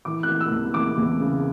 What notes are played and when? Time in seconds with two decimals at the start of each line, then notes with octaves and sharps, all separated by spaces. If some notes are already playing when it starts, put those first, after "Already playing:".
0.05 E3 D6
0.23 F#6
0.29 E3
0.41 E6
0.51 E2
0.74 E3 D6
0.98 E2
1.21 C#3